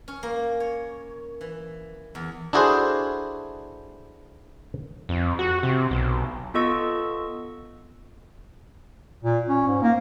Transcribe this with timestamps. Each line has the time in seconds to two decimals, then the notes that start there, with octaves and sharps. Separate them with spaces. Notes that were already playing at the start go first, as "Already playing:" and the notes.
0.08 C#4
0.23 A#3
0.60 C#5
1.41 E3
2.15 E2
2.53 D4 E4 F#4 G#4 A4 C5
5.09 F2
5.39 F#4
5.63 C3
5.91 B1
6.54 B3 F4 A4 D#5 C#6 E6
9.23 A#2
9.48 C#4
9.67 G#2
9.82 A#3